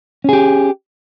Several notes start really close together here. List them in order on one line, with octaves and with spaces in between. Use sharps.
C#4 G#4 G4